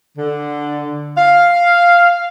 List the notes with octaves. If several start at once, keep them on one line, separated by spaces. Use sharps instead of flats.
D3
F5